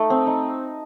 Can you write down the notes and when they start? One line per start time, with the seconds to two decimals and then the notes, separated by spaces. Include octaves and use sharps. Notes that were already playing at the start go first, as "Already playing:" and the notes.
Already playing: A3 D#4
0.10 C4
0.27 D#4